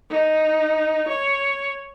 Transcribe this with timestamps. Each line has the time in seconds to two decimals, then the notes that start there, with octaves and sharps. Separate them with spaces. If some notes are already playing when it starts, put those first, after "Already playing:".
0.10 D#4
1.09 C#5